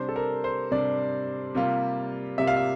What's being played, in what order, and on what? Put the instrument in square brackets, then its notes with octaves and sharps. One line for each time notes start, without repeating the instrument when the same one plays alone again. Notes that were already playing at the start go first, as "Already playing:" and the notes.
Already playing: [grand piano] C3 G3 D4 C5
A4
A#4
C5
C3 G3 D4 D5
C3 G3 A#3 F4
C3 G3 A#3 F4 E5
F5
E5